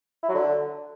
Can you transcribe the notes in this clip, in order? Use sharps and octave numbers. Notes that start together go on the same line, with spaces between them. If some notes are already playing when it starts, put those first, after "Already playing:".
E4
F#3
D3